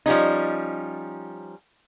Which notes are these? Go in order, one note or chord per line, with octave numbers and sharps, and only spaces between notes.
F3 G3 C#4 D#4